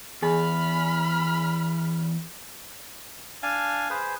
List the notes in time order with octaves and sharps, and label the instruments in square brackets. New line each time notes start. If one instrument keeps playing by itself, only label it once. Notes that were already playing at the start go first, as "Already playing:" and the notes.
[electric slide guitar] E2 [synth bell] G#4 G#5 [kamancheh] B5 F6
[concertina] D4 F5 G#5 A5
G#4 B4 C5